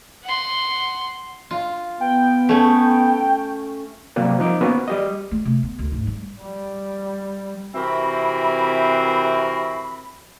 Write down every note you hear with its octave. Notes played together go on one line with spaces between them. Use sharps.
F#5 C6
F4
B3 G5
A3 C#4
C3 F#3 G3 A#3 G4
F3 D#4 D6
A#3 B3 C#4 F#4 B4 C5
G3 G4 D#5
A3
C3
B3
D2
G#2
G3
G3
C3 E3 C4 F#4 A#4 B5